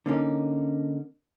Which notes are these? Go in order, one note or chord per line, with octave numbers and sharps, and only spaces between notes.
D3 A#3 C#4 D#4